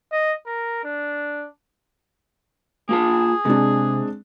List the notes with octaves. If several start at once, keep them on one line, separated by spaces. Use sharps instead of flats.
D#5
A#4
D4
A#3 F4 G#4 A5
C3 G#3 C4 D4